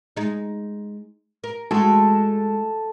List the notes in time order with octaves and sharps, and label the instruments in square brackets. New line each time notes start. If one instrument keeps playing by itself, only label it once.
[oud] G#3 D#4
A#4
[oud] G#3 A3 [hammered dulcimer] A4